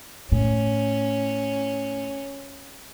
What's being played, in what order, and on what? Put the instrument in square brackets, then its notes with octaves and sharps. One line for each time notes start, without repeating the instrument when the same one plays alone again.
[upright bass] A2 [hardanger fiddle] C#4